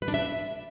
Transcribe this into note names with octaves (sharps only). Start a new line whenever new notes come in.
B4
D4
E5